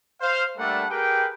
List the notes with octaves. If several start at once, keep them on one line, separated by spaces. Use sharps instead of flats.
C5 F5
G3 A3 A#3 D4 A4 F#5
G4 G#4 A#4 B4 G5